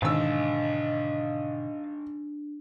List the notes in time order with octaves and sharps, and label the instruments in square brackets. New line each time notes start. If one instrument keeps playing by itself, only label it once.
[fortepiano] G#1 E6 [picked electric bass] G#2 B2 D3 [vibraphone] D4 [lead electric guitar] D#5 F5